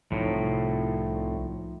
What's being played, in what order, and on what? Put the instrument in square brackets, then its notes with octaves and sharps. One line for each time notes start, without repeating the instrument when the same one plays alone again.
[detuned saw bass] C2 [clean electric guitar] A2 [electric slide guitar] F3 D#4